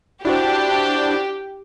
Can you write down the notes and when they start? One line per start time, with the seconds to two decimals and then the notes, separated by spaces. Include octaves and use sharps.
0.25 D4 E4 F#4 G4 C5